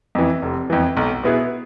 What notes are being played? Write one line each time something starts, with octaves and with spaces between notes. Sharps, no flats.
F2 E3
F1
F2 E3
B1
B2 B3 E4 G#4